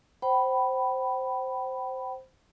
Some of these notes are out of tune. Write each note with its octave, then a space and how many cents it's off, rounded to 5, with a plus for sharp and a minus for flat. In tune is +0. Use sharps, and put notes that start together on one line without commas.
C5 +0 G5 -35 B5 +0